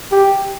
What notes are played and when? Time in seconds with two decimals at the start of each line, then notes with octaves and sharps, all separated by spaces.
0.12 G4